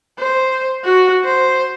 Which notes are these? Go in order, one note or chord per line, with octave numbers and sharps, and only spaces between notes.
C5
F#4
C5